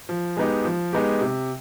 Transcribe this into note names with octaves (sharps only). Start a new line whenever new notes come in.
F3
G#3 B3 D#4 G4
F3
G#3 B3 D#4 G4
C3